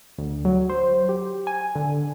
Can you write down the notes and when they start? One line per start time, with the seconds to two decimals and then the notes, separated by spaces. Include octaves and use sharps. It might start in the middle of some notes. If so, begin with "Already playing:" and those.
0.18 D2
0.45 F#3
0.70 C5
1.09 G4
1.47 G#5
1.75 D3